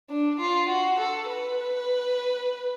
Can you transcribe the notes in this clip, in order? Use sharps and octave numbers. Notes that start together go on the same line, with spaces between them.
D4
F4
F#4
A4
B4